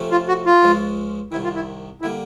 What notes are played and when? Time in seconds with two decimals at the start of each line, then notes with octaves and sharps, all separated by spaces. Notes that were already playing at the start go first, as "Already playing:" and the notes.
Already playing: F2 C3 F3 A3 C#4
0.11 F4
0.28 F#4
0.46 F4
0.63 C#2 C#3 F3 G#3 C#4
1.32 C2 C3 D#3 E4
1.44 F4
1.55 E4
2.01 D3 G3 A#3 E4